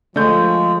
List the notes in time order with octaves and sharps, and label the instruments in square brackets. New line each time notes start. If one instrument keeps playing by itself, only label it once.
[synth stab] D3 [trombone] F3 [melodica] G#3 [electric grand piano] A3 G6